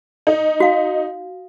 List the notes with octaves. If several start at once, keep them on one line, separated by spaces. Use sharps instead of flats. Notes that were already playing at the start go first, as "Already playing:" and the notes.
D#4
F#4 F5